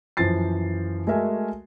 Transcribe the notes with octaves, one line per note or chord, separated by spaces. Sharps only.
F#2 E3 F3 C5 A6 C7
G#3 A3 F#4 A#4 E5 G#5